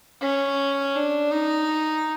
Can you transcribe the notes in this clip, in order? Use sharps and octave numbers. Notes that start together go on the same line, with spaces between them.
C#4
D4
D#4